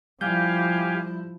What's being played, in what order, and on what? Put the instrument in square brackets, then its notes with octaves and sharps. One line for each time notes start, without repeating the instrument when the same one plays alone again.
[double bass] F3 E4 [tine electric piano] G3 G6 [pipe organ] G4 F5 G#5